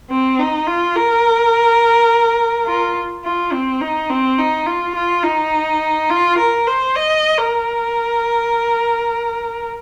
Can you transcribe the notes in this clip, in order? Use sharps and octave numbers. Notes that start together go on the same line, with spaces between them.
C4
D#4
F4
A#4
F4
F4
C4
D#4
C4
D#4
F4
F4
D#4
F4
A#4
C5
D#5
A#4